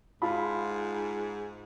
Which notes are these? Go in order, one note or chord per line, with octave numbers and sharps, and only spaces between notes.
G#2 F4 A5 B5